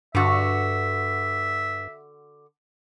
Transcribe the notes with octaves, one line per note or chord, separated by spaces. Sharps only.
G2 D3 F#4 E5